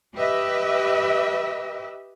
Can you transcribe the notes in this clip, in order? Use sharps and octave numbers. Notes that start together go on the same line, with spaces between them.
G4 B4 D#5 E5